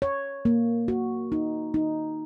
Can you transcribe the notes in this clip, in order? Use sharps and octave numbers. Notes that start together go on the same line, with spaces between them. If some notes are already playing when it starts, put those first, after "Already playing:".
C#5
A#3
F#4
D#4
D#4